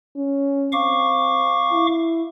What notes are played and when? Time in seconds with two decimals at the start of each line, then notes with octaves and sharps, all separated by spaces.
0.16 C#4
0.72 C4 F5 C#6 D6
1.72 E4